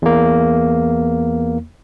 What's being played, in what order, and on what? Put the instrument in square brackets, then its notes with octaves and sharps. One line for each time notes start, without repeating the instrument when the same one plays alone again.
[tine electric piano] E2 A#3